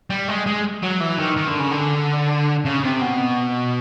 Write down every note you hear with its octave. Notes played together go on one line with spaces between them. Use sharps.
G3
G#3
G#3
F#3
E3
D#3
D#3
D3
C#3
D3
C#3
C3
B2